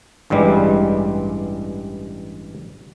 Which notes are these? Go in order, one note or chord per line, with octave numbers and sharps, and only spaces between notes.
A1 G2 E3 G3 G#3